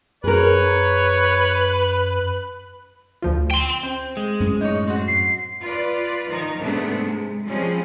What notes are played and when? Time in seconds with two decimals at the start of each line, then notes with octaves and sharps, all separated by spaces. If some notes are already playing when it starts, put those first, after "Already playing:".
0.24 F#2 G#4 A#4 B4 C#5
3.22 D2 F3 F4
3.51 G5 C6
3.83 C4
4.17 G#3
4.40 F#2 A2 C#4
4.61 D#4 C#5
4.87 C4 F#4
5.08 C7
5.62 F4 B4 D5
6.28 D#3 F3 D#4 A#4
6.59 G#2 C3 A3 B3 D4
7.04 G#3
7.46 F3 G3 G#3 C4 C#4 G#4